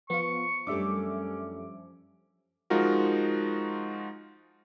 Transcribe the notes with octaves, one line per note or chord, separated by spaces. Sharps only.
F3 B3 F4 C#6
F#2 G3 A3 C#4 D4 E5 D6
F3 G#3 D#4 F4 F#4 A#4